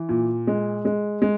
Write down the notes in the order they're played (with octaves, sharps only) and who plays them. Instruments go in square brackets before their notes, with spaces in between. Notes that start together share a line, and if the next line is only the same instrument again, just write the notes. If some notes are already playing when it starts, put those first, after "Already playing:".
Already playing: [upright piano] E3
A#2
G#3
G#3
G#3